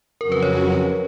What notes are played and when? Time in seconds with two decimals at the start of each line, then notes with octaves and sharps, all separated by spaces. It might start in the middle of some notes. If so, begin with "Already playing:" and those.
0.21 F2 C#3 F#3 C#4 F#4 A#4
0.32 B4
0.42 C#5